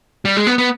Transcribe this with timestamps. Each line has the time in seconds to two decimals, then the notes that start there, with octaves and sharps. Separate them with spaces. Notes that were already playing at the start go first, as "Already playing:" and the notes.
0.25 G3
0.37 G#3
0.47 B3
0.58 B3